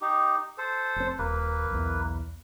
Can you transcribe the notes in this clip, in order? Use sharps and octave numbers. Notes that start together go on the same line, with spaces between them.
D#4 G4
A4 C5
F1 C4
D#1 A#3 B4
B1 E2